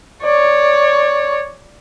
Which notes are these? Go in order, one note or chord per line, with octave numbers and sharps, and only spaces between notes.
C#5 D5